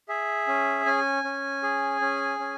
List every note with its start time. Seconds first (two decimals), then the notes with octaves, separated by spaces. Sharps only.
0.09 G#4 E5
0.47 C#4
0.86 C#4 G#5
1.24 C#4
1.63 G#4
2.01 C#4
2.39 C#4